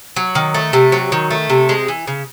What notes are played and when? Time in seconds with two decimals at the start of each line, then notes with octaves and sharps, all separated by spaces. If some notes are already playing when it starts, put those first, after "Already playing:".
0.16 F#3
0.35 D#3
0.54 A3
0.73 C3
0.92 F#3
1.12 D#3
1.30 A3
1.50 C3
1.69 G#3
1.88 E3
2.07 C#3